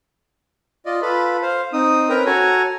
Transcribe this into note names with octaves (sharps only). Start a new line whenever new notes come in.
F4 D5 D#5
F4 A4 B4 B5
C5 F5
C4 D#4 D#6
C4 C#4 A#4 B4 G5 A#5
F#4 A4 C#5 G#5 A#5